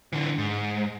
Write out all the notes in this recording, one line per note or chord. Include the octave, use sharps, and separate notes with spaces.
D3 E3
G#2